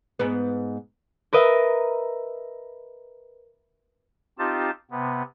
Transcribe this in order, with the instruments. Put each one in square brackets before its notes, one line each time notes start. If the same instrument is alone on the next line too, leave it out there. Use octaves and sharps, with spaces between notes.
[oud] G#2 B3
[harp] A#4 B4 D#5 E5
[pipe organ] C4 D#4 F4 G4 A5
C3 B3